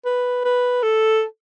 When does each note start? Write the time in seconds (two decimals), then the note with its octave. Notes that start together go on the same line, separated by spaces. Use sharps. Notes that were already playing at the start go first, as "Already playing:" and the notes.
0.05 B4
0.44 B4
0.83 A4